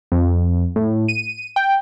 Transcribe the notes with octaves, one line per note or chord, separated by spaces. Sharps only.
F2
A2
D#7
G5